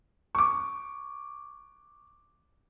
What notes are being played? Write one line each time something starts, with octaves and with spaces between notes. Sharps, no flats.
C#6 D6